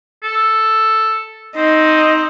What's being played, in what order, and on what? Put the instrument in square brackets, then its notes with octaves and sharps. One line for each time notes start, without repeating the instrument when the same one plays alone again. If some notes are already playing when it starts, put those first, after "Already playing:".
[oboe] A4
[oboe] C4 [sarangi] D#4